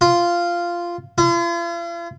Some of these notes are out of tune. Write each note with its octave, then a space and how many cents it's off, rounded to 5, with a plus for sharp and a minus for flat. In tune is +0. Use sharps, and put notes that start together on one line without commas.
F4 -10
F4 -45